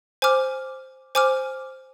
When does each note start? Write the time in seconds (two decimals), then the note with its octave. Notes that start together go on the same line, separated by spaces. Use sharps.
0.22 C5 G#5 D6 F6
1.15 C5 G#5 D6 F6